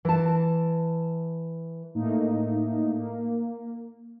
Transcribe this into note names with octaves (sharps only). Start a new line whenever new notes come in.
E3 A5
A2 A3 A#3 D#4
A#3